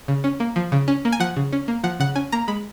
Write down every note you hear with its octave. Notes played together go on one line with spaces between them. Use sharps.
C#3
C#4
A#3
F3
C#3
C#4
A#3
G#5
F3 F#5
C#3
C#4
A#3
F3 F#5
C#3 F#5
C#4 G#5
A#3 A#5
G#3 B5